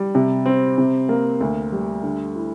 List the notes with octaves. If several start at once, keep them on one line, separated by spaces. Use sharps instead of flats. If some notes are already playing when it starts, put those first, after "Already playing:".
Already playing: G3
C3
C4
C3
A#3
D2
G3
D3
E4